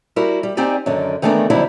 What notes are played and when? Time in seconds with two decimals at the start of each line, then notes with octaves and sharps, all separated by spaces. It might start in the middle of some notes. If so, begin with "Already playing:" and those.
0.16 G3 E4 F#4 A#4
0.43 G3
0.57 C4 D#4 G4 D5 G#5
0.86 F#2 D3 D#3
1.22 D#3 E3 A3 B3 D4 A#4
1.50 F2 D3 F#3 G3 C4 E4